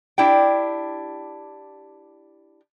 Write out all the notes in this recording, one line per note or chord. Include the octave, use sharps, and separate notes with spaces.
D4 E4 G4 G5